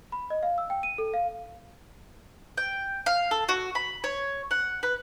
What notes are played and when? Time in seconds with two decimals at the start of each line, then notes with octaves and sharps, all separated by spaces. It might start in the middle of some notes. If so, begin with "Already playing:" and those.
0.12 B5
0.30 D#5
0.43 F5
0.58 E6
0.70 G5
0.83 D#7
0.98 A4
1.14 F5
2.57 G5
3.06 F5
3.31 A4
3.49 F#4
3.75 B5
4.04 C#5
4.51 F#5
4.83 B4